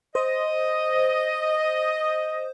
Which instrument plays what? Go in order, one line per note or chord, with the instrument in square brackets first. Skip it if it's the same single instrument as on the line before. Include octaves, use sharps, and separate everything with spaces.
[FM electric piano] C5 [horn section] D#5